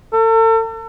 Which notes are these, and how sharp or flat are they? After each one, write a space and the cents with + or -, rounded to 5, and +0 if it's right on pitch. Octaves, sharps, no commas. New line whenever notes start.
A4 +40